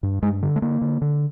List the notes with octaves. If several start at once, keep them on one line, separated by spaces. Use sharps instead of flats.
G2
G2 G#3
D3
A3
D3 A#3
D3
D3